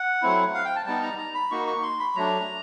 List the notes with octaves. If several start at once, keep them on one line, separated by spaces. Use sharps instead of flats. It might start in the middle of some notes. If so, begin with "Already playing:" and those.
Already playing: F#5
F#3 A3 C4 E4
F5
G5
A5
G3 B3 D#4 A5
A#5
A#5
B5
A#3 D#4 F#4 C#6
C#6
C6
B5
F#3 A3 D4 A#5